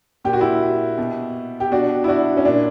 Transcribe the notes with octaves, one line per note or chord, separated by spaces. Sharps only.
A#2 G4
F#4
E4 G4
B2
G4
B2 D4 F#4
E4
D4 F#4
C#4
A#2 D4